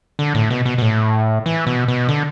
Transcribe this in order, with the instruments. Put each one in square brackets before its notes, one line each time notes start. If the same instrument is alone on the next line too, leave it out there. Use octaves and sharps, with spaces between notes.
[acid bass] D3
A2
B2
B2
B2
A2
E3
B2
B2
D3